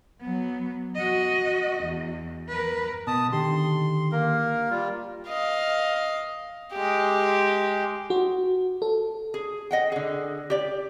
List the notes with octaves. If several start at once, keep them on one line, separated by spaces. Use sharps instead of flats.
F#3 B3
F#4 D#5
E2
A#4 B4
B2 A5 D#6
D3 D#3 G4 C6
A#3 A#4
G3 F4
D#5 F5
G#3 G4
F#4
A4
G#4
D#5 F#5 G5
D3 G#4
G4 D5